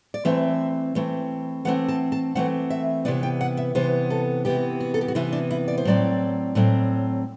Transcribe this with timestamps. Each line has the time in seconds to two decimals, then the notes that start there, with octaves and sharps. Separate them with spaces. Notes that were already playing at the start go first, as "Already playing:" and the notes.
0.14 D5
0.25 E3 A3 C4 E5
0.95 E3 A3 C4
1.65 E3 A3 C4 F#5
1.88 A5
2.12 A5
2.35 E3 A3 C4 F#5
2.70 E5
3.05 C3 E3 B3 D5
3.23 G5
3.41 F#5
3.57 E5
3.75 C3 E3 B3 C5
4.10 A4
4.45 C3 E3 B3 G4
4.80 F#4
4.94 A4
5.01 G4
5.08 F#4
5.15 C3 E3 B3 E4
5.33 D4
5.51 E4
5.68 D5
5.78 C5
5.85 A2 F#3 C4 D5
6.55 A2 F#3 C4